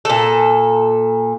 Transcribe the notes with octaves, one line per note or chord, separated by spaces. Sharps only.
A#2 A4